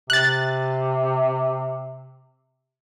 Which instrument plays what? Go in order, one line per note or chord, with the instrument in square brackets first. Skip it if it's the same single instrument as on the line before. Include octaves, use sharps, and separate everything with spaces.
[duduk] C3 [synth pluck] F#6 A6